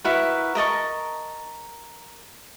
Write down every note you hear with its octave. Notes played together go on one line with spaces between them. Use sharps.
E4 F#4 A#4 B4
A#4 D#5 A5 C#6